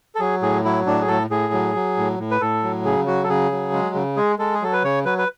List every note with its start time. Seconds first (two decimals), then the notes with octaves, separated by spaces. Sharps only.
0.15 A4
0.20 F#3 G#4
0.42 A2 G#4
0.65 F#3 E4
0.86 A2 D4
1.01 G#4
1.08 A2 A4
1.30 A2 G#4
1.53 F#3
1.75 F#3
1.97 A2
2.19 A2
2.31 B4
2.41 A2 A4
2.63 F#3
2.85 C#3 G#4
3.07 F#3 F#4
3.24 A4
3.29 C#3 G#4
3.52 F#3
3.73 G#3
3.95 C#3
4.17 G#3 G#4
4.39 G#3 A4
4.54 G#4
4.62 F#3 A4
4.73 B4
4.84 C#3 C#5
5.05 F#3 B4
5.18 B4